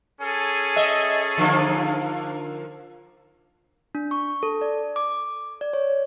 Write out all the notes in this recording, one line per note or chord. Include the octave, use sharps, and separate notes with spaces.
C#4 G#4 A4
D#5 E5
D3 F3 A#3
D4
C#6
A4
D5
D6
D5
C#5